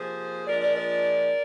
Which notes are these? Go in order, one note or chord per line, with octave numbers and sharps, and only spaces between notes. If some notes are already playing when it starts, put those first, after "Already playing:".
Already playing: C3 F3 A#3 G#4 C5
A#2 F3 G#3 D4 A#4 D5
A#4 D5
A#4 D5